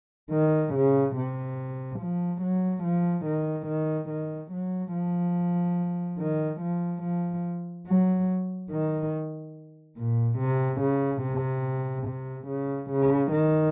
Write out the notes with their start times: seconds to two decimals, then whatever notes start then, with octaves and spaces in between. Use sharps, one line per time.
0.32 D#3
0.74 C#3
1.16 C3
2.00 F3
2.42 F#3
2.84 F3
3.26 D#3
3.67 D#3
4.10 D#3
4.52 F#3
4.93 F3
6.19 D#3
6.61 F3
7.03 F3
7.87 F#3
8.71 D#3
9.97 A#2
10.39 C3
10.81 C#3
11.22 C3
12.07 C3
12.48 C#3
12.91 C#3
13.32 D#3